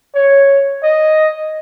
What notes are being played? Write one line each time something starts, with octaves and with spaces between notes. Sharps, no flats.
C#5
D#5